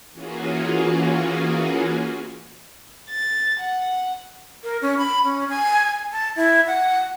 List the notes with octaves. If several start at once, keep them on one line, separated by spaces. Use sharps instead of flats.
E3 A#3 C#4 F4 F#4 G#4
A6
F#5
A#4
C#4
B5
C#4
G#5
A5
E4
F#5